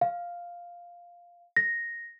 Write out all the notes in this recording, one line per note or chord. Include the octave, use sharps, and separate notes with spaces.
F5
A#6